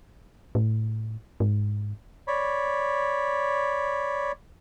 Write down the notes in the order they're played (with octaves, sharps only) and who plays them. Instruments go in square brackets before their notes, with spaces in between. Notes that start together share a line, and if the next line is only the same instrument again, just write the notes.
[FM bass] A2
G#2
[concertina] C#5 D5 B5